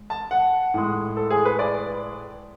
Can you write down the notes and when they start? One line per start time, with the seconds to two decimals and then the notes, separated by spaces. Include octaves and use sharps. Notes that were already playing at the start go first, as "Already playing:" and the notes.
Already playing: G#3
0.10 A5
0.31 F#5
0.74 A2 G#3
1.17 A4
1.31 G#4
1.45 B4
1.59 D5